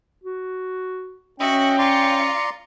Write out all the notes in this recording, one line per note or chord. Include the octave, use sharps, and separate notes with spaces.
F#4
C#4 F#4 D#5 E5 G5
F4 D5 A#5 C6 C#7